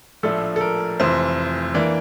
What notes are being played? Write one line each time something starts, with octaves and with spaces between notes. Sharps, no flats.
A#1 A2 F3 A3 D4 A4
A4
A#4
F1 F2 E3 C5
E3 A#3 D4